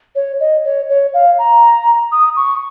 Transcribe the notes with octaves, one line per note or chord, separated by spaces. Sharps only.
C#5
D#5
C#5
C#5
F5
A#5
D#6
C#6